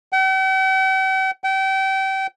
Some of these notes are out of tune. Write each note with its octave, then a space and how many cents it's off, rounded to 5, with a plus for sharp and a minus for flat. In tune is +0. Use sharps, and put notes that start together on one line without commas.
G5 -45
G5 -30